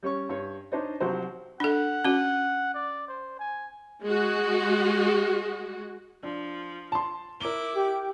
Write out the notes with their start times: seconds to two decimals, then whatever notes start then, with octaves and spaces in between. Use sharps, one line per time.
0.03 G3 C#4 C#5 C#6
0.29 G2 C#5
0.72 D4 D#4 C5 C#5 D#5
1.00 C2 F3 F#3 C5
1.60 D4 A4 F#5
2.05 C#4 F#4
2.74 D5
3.08 C5
3.39 G#5
4.02 G#3 F#4
6.23 F3 D4
6.92 A5 C6
7.40 E4 A#4 D6 G7
7.75 G4